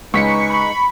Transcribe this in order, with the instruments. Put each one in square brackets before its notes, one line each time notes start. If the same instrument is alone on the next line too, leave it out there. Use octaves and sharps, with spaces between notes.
[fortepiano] C#2 [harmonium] G#3 D#4 B4 [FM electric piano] C#6 B6 C#7
[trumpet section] B5